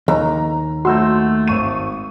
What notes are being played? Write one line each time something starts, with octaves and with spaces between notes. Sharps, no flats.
D#2 A#5
A3 F#4 C6 E6 G6
G#1 C#6 D#7